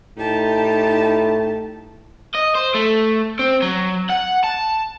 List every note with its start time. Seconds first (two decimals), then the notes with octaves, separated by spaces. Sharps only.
0.18 A2 D#4 G4 A5
2.35 D#5
2.55 C5
2.75 A3
3.39 C4
3.62 F#3
4.10 F#5
4.44 A5